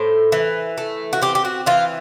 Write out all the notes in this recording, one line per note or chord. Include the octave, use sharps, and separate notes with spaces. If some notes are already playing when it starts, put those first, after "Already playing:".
Already playing: A2 C5
E3
A3
F#4
C4 G4
G4
F#4
E3 F4